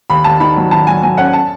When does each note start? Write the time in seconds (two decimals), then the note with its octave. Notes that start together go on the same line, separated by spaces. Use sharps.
0.10 D#2 B5
0.24 D#2 A5
0.40 D#3 B5
0.57 F#3
0.71 D#3 A5
0.87 F#3 G#5
1.02 F#3 G#5
1.18 C#4 F#5
1.33 A5